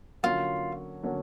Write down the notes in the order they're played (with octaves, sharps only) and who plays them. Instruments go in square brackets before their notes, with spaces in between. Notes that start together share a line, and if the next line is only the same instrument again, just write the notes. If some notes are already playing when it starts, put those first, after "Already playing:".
[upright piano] D3 F#3 A#3 C#4 F#4 [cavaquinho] F4
[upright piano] D3 F#3 A#3 C#4 F#4